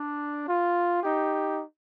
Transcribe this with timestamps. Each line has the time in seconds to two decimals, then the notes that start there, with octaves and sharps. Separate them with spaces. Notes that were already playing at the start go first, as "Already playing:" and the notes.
Already playing: D4
0.47 F4
1.03 D#4 G4